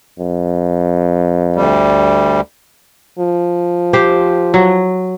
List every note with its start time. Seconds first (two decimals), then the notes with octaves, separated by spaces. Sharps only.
0.19 F2
1.56 D2 G3
3.19 F3
3.93 G4 C5
4.54 F#3